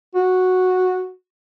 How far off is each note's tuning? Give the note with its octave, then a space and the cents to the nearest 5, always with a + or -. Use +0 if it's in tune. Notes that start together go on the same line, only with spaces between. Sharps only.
F#4 -5